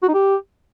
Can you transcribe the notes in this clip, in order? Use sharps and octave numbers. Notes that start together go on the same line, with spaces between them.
F#4
D#4
G4